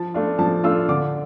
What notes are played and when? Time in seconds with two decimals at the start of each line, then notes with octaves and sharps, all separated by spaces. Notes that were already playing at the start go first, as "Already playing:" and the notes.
Already playing: F3 A5
0.14 A3 D4 F4
0.39 F3 A5
0.64 A3 D4 F4 E6
0.89 D3 D6